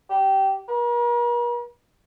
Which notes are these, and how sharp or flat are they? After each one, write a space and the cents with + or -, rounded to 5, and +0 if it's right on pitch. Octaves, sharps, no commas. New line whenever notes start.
G4 -20
A#4 +45